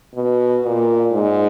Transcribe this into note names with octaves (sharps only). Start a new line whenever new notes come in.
B2
A#2
G#2